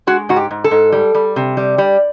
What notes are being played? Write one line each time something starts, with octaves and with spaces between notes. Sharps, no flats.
G#3 F#4
G#2 F#4
G4
G#2
A4
G#2
G3
G3
C3
G3
G3